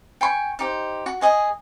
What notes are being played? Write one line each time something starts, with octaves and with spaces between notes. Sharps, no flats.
G5 G#5 C6 C#6
D#4 G4 C5
F#4
G#4 D#5 G#5